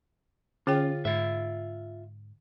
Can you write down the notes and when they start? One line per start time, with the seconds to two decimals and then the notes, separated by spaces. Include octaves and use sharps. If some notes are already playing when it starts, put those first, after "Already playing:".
0.67 D3 C#4 F4 G#4 G5
1.05 G#2 F4 E5